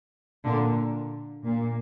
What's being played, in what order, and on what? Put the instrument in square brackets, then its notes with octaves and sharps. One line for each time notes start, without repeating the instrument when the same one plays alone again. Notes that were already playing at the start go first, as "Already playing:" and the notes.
[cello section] A#2 D3
A#2